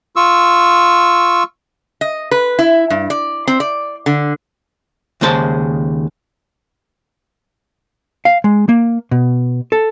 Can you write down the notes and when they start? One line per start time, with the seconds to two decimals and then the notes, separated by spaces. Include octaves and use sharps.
0.16 F4 C#6 E6
2.01 D#5
2.31 B4
2.59 E4
2.90 G2
3.10 D5
3.47 C4
3.60 D5
4.06 D3
5.21 D#2 C#3 G#3 C5 A5
8.25 F5
8.44 G#3
8.69 A#3
9.11 B2
9.72 A4